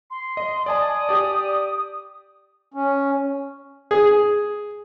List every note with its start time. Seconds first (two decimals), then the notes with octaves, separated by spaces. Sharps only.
0.11 C6
0.37 D#5
0.66 D5 G#5 A5 D#6
1.09 G4 D5
2.74 C#4
3.91 G#4